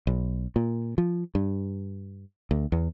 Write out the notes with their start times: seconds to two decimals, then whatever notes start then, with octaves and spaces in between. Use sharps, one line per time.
0.07 B1
0.56 A#2
0.98 F3
1.35 G2
2.51 D2
2.72 E2